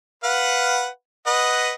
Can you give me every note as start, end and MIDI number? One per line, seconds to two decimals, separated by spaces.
0.24 0.87 71
0.24 0.87 77
0.24 0.87 78
1.27 1.73 71
1.27 1.73 75
1.27 1.73 78